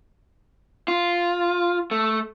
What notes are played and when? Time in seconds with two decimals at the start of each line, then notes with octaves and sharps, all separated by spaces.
0.88 F4
1.91 A3